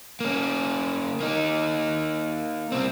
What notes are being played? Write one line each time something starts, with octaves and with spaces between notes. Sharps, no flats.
A#3 C#4
A#3 D#4
C2 C4